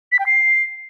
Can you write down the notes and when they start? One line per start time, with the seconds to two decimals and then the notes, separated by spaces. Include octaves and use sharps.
0.12 B6
0.19 G5
0.26 C7